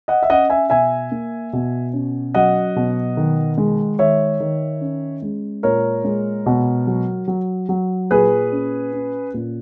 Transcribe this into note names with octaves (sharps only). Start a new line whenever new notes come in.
D#5 F#5
E5
C#4 D#5 F#5
E5 G#5
B2 E5 G#5
A#3
B2
C#4
F#3 D#5 F#5
B2
D#3
G#3
D#3 C#5 E5
D#3
C#4
G#3
A#2 A#4 C#5
G#3
B2
F#3
F#3
F#3
A#2 G#4 B4
C#4
C#4
A#2